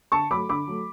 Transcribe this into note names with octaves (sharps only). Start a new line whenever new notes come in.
D3 A5 C#6
F#3 A3 B5 D6
D3 B5 D6
F#3 A3